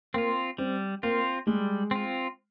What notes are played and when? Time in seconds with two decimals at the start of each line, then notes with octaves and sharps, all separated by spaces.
0.14 A#3 C4 F4
0.58 G3 C4
1.03 A#3 C4 F4
1.47 G3 G#3
1.91 C4 F4